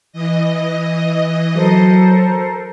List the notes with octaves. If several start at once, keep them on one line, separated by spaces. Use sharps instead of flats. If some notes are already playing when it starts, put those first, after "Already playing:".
E3 D#5
F#3 A4 A#4 C5